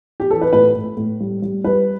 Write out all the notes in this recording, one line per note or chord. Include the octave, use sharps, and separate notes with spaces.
G4
E3 A4
B4
A2 B4
A2
A2
G3
G3
G3 B4